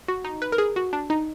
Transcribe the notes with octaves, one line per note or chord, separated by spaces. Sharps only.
F#4
D#4
B4
A#4
G#4
F#4
D4
D#4